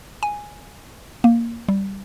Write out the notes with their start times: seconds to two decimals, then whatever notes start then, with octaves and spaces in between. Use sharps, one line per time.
0.23 G#5
1.24 A#3
1.69 G3